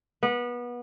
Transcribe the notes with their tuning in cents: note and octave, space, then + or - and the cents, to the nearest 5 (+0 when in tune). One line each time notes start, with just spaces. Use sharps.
B3 -25